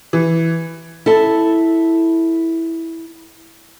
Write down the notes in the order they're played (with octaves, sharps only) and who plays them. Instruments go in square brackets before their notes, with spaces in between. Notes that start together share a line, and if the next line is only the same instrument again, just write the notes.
[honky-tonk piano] E3
[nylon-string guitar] E4 A4 A5